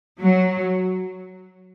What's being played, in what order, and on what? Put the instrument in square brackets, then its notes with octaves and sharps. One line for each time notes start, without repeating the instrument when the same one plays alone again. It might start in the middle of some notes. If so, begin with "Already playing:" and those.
[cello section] F#3